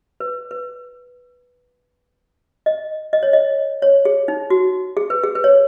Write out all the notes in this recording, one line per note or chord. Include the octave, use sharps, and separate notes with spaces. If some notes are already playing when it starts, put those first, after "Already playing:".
B4
B4
D#5
D#5
C#5
D#5
C#5
G#4
D#4
F#4
G#4
B4
G#4
B4
C#5